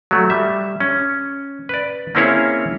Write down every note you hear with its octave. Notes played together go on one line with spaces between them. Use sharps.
F#3 A3
G3 E5
C#4
B4 D5
A#3 C4 C#4 E4 G#4 C#5